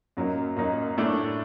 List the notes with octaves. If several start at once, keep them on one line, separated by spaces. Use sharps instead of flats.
F#2 F#3 A#3 D#4
F#2 F#3 A#3 D#4
A2 A3 D4 A4 D5